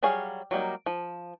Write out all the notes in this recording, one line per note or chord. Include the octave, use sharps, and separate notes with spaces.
F#3 G3 G#4 C#5 F5
F#3 G3 A#3 D#4
F3